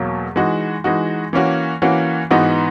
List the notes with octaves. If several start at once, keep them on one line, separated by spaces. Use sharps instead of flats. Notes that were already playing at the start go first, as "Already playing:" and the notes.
Already playing: E2 B2 F#3 A#3
E3 G#3 D#4 F#4
E3 G#3 D#4 F#4
E3 A#3 C#4 F#4
E3 A#3 C#4 F#4
G#2 E3 B3 D#4 F#4